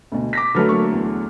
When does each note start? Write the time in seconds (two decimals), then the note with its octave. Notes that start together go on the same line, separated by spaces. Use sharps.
0.12 D2 B2
0.33 D6 A#6 B6
0.55 D3 F#3 A3 B4 F6
0.69 A#3 C#6
0.92 E2